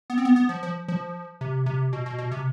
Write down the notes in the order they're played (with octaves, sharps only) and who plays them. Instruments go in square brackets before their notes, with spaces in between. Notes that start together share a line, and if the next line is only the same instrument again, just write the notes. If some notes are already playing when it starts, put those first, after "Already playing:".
[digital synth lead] B3
C4
B3
B3
F3
F3
F3
C3
C3
B2
B2
B2
C3